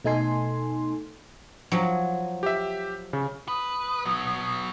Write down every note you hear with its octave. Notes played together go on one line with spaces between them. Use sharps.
B2 A3 D#4 A4 G#5 C6
F3 F#3
G4 E5
C#3
B4 D#6
F#3 B3